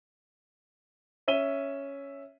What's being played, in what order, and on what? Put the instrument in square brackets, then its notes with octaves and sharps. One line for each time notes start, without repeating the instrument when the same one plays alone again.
[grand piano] C#4 E5 D#7 G7